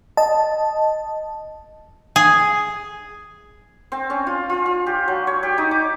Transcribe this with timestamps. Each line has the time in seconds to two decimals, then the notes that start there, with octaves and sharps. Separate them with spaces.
0.17 D#5 A5
2.16 G#4
3.92 C4
4.10 C#4
4.27 F4
4.50 F4
4.66 F4
4.86 G4
5.08 F#3
5.27 C#5
5.43 G4
5.58 D#4
5.71 D6